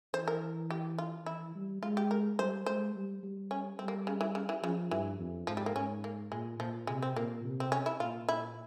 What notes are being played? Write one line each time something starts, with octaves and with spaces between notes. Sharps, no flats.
E3 C5
A#4
G4
F4
E3 E4
G3
G#3 F4
G4
A#4
G3 C5
G#3 C5
G3
G3
C#4
G3 C4
A#3
C#3
E3
C#3
E3
C#3 F3
G2 E3
F2
G#2 F3
G3
A#3
G#2 C#4
A#3
A#2 G#3
A#2 F3
C3 G#3
C4
A#2 A#3
C3
C4
C#4
E4
A#2 F4
E4